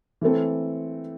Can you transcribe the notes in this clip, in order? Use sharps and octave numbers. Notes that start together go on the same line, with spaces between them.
E3 A3 C4 A4